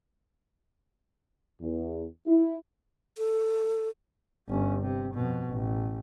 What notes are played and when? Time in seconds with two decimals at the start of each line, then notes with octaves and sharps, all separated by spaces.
1.61 E2
2.27 E4
3.18 A4
4.49 G1 C#4
4.82 C3
5.15 F2 B2
5.50 A1